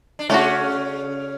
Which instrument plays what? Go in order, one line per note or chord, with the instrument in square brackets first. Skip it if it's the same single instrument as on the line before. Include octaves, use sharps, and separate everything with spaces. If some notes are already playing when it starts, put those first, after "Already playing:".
[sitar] D4
[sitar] C#3 C#4 [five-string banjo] A3 D4 F#4